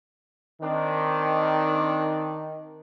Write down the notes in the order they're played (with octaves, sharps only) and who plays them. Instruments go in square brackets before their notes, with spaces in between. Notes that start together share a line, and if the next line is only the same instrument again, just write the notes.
[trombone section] D#3 [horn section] C4 D4